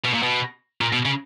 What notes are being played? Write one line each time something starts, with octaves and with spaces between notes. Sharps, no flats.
B2
A#2
B2
A#2
B2
C#3